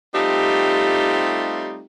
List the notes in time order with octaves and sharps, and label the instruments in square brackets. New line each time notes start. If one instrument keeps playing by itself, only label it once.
[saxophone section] G3 A3 C4 D#4 F4 G4